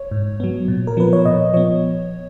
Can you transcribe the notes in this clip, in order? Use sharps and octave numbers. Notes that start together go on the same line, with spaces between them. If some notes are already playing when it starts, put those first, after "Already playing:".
Already playing: C#5
G#2
F#3 B3
A#2
A#4
F3 B3 B4
C#5
A#2 D#5
F3 B3 C#5